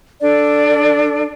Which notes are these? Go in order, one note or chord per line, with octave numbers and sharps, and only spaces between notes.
D4 A4 D5